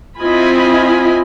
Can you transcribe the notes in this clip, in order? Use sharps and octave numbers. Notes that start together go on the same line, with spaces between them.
C4 E4 F4 D#5 G#5 B5